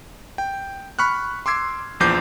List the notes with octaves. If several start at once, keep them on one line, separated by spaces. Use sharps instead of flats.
G5
B5 C#6 F6 F#6
C6 D6 E6 G#6 C7
A#1 E2 F3 D6 G6 C7